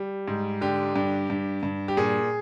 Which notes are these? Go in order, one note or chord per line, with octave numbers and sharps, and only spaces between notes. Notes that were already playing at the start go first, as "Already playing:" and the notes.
Already playing: G3
G#2
D3 G4
G2
G2
G2
G4
A#2 G#4